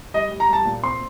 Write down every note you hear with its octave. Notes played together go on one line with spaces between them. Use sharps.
G3 D#5
G3
A#5
G3 A5
A#2
C4 C6